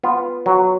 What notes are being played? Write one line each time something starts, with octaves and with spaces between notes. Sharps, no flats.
B3 F4
F#3